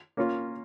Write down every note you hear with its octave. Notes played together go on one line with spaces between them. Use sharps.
A#3 C#4 F4